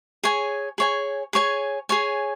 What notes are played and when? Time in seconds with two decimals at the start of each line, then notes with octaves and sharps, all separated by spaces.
0.24 G#4 C#5 G#5
0.78 G#4 C#5 G#5
1.33 G#4 C#5 G#5
1.89 G#4 C#5 G#5